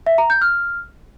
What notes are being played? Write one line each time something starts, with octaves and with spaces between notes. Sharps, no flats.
E5
A#5
G6
F6